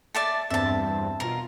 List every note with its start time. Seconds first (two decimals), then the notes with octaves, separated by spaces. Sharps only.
0.15 D5 E5 A5
0.50 E2 G2 C4 E5 A5
1.20 B2 F4 A#4